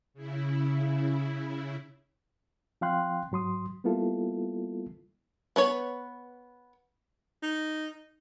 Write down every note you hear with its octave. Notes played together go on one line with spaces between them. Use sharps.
C#3 E4
F3 C4 F5 G5 C6 F#6
G#2 F#3 C6 D#6
G3 A#3 B3 E4 F4 A4
B3 B4 C#5
D#4